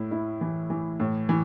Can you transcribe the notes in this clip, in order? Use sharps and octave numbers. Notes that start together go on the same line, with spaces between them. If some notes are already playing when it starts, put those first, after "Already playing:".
Already playing: A2 E4
E4
E3
E3
A2
E3